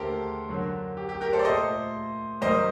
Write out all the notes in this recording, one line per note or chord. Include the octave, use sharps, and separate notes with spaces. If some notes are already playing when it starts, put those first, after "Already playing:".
Already playing: D#2 D3 A3 G4 A4 A#4 C5
F#2 D3 F#3 A#3
G4
G4
G4 A#4
A4 C5
D5
A#2 A3 C5 D#5
F#2 D#3 G3 A#3 C5 D#5